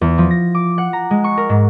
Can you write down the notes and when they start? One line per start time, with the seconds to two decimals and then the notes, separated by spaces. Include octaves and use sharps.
0.01 E2
0.18 F3
0.31 A#6
0.55 D6
0.78 F#5
0.93 A#5
1.11 G#3
1.24 C#6
1.37 A#4
1.49 G#2